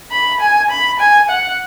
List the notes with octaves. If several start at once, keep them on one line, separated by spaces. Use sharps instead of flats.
B5
G#5
B5
G#5
F#5